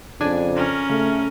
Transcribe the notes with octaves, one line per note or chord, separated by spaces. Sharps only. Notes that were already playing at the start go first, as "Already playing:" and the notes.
F2 C#3 D4 G#5
C#4 A#4
C#3 A3